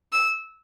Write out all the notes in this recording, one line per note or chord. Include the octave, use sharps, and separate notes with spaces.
E6